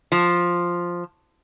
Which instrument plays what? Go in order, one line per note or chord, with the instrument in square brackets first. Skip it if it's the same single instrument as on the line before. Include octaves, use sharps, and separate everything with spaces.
[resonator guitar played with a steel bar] F3